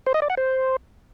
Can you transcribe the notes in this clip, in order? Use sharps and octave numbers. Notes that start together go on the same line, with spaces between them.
C5
D#5
D5
F#5
C5